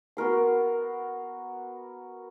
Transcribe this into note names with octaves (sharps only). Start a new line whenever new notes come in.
B3 F#4 A#4 C6